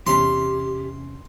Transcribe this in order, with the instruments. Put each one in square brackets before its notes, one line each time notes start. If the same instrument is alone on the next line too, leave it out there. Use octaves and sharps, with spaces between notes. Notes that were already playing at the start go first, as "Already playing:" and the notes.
[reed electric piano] E2 C3 C#4 [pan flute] G4 [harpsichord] C6